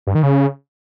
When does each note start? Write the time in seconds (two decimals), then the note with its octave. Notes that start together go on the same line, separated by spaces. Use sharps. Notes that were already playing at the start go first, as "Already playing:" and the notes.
0.07 G2
0.15 D#3
0.23 C#3